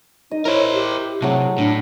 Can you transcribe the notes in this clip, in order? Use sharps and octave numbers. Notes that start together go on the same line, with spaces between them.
D#4 D#5
E4 A#4 C5 C#5
G4
C3 F#3 A3 G#4
A2 D4